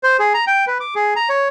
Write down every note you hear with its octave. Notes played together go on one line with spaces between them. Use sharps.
C5
G#4
A#5
G5
B4
D6
G#4
A#5
C#5